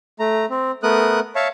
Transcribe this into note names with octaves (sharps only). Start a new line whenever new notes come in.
A3 A#5
C4
A3 B3 A#4 D#6 F#6
C#5 E5 F5 A5 C#6